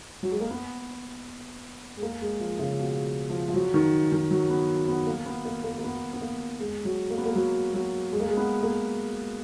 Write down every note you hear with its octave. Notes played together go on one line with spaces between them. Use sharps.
F#3
G#3
A#3
B3
G#3
A#3
G#3
F3
C#3
B2
F3
F3
F#3
D#3
D#3
F#3
B3
B3
A#3
B3
A#3
A#3
A#3
B3
B3
A#3
G#3
F#3
A#3
B3
A#3
F#3
F#3
G#3
A#3
G#3
B3
A#3